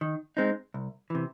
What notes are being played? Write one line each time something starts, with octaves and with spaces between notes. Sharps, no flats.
D#3
G#3 C4 D#4
C2
C3 E3